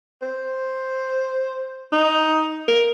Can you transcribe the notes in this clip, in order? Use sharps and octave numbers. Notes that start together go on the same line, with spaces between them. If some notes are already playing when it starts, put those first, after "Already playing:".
C5
D#4
A#4